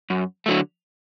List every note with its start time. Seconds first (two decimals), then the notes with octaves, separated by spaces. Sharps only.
0.10 F#2
0.46 D3 F#3 A3